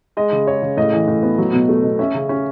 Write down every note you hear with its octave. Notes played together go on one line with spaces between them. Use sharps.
G#3 D#5
C#3
G#3 C#5
C#3
A2 D#5
E3
A2
B3
F#3
B2
A3
B2
C#4 E5
C#3
C#4